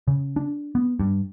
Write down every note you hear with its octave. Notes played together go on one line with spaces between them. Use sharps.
C#3
D4
B3
G2